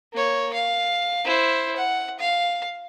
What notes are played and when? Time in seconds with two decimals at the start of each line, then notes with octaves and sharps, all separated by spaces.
0.13 A#3 C#5
0.54 F5
1.25 E4 C5
1.77 F#5
2.20 F5